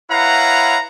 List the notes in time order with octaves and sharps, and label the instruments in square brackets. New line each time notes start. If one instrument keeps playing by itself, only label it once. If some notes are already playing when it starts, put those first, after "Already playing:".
[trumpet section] E4 B4 C#5 F5 F#5 A#5